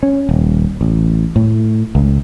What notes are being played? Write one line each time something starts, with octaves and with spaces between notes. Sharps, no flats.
C#4
D#1
A1
A2
C#2